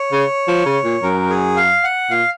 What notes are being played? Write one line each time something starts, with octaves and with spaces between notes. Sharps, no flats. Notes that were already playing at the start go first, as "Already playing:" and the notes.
Already playing: C#5
C#3
F3
C#3
A#2
F#2 A#4
G#4
F5
F#5
A#2 F5